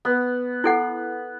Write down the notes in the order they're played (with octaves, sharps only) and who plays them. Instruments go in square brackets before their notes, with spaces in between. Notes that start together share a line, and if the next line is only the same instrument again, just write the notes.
[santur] B3
[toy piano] E4 A4 F#5